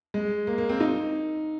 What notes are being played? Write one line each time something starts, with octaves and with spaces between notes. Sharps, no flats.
G#3
A#3
A#3
C4
D#4